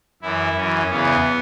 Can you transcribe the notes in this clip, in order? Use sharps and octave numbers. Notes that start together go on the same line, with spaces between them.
F#2 E3 E4
F#2 E3 C#4
E2 C#3 E3 B3